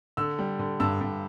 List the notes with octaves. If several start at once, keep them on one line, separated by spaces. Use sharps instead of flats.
D3 E6
G3
D3
G2 E6
G2